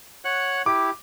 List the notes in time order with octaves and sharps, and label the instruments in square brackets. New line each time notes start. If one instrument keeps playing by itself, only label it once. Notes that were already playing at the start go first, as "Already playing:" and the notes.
[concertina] C#5 F#5 F#6
[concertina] E4 G4 [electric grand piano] D6